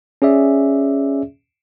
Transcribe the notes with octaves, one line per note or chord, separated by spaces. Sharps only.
C#4 G#4 D5 E5